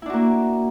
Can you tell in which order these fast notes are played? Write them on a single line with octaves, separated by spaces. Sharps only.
E4 D4 F#4 A#3